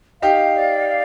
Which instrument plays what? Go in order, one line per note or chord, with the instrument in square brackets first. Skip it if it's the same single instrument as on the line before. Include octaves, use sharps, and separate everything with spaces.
[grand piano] D#4 G4 [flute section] F5
[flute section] D5
F5